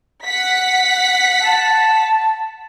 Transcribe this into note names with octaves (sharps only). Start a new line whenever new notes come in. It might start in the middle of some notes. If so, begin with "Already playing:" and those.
F#5 B6
A5